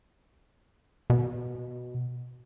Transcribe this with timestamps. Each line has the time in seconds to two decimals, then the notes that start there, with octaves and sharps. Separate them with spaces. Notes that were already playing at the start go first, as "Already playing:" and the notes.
1.10 B2